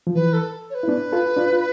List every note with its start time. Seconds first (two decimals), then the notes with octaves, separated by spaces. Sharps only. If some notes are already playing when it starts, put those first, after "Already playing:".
0.07 F3
0.15 E3 B4
0.33 A4
0.70 C#5
0.74 B4
0.83 E4
0.88 B3 D4
1.12 F4 A4
1.37 D4 F4
1.53 F4